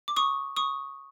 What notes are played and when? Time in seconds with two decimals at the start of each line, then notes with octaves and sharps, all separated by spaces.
0.08 D6
0.16 C#6 D#6
0.56 C#6 D#6